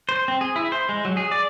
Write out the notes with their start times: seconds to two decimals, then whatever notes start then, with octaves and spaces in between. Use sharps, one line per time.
0.09 C5
0.28 C4
0.41 G#4
0.56 E4
0.72 C5
0.89 G#3
1.05 F#3
1.17 G#4
1.32 D5